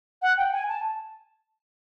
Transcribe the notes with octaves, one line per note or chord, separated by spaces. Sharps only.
F#5
G5
G#5
A5